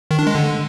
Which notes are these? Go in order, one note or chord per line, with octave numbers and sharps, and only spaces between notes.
D#3
D4
G#3
D3